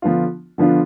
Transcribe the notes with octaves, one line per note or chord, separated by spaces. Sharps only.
D3 F3 B3 D4 F4
D3 F3 B3 D4 F4